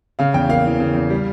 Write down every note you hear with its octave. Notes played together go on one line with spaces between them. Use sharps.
C#3 F5
E2 G5
A#3 F5
E3
C#3
E2
G3